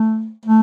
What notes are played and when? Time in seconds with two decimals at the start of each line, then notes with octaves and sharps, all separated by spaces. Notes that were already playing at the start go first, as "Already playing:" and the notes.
Already playing: A3
0.46 A3